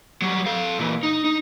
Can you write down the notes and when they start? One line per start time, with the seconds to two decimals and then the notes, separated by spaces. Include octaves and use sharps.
0.22 F#3 G3
0.46 A4 F5
0.79 A#2 E3
1.03 D#4
1.24 D#4